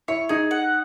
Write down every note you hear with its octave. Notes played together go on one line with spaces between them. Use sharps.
E4 C#5
D#4 G#4
F#5